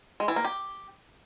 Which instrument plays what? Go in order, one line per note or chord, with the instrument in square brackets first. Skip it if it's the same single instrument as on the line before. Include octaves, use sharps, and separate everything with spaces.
[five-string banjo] G#3
E3
A#3
G4